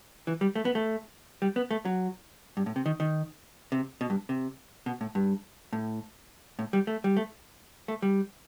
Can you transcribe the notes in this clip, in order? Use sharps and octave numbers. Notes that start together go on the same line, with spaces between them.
E3
G3
A3
B3
A3
G3
B3
A3
F#3
G2
A2
C3
D#3
D#3
C3
B2
G2
C3
B2
A2
G2
A2
A2
G3
A3
G3
A3
A3
G3